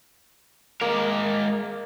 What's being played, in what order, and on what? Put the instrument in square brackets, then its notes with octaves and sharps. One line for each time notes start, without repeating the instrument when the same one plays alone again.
[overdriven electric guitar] G#3 A#4 [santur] A#3